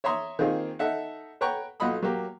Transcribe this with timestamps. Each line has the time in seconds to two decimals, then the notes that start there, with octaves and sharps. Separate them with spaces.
0.04 C#5 E5 A#5 C6 D#6
0.39 D#3 A#3 C4 D#4 F4 G#4
0.79 D#4 A4 E5 F#5
1.41 B4 C#5 F#5 G5 A#5 C#6
1.80 B1 F4 D#5 F#5 B5 D#6
2.02 F#3 A#3 G4